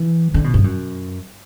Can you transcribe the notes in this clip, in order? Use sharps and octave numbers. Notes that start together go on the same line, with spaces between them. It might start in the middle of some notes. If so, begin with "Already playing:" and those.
Already playing: E3
D3
B2
G2
F#2